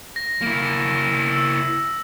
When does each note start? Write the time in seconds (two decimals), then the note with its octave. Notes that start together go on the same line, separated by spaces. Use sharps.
0.16 A#6
0.42 A#3 E4
1.31 E6